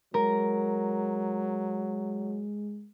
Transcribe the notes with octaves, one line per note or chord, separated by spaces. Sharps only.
F#3 G#3 A#4